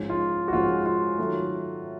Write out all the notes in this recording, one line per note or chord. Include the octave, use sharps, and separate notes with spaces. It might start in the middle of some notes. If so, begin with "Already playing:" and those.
Already playing: G#2 F3 G#3 C#4
F4
F#4
G#2 F3 G#3 C#4 F4
F4
D#3 F#3 A3